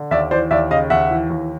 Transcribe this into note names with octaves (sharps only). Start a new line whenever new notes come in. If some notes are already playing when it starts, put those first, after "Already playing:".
Already playing: D3
D#2 D5 E5
E3 C5 D5
D#2 D5 E5
C#3 D#5 F5
D#2 E5 F#5
E3
D#2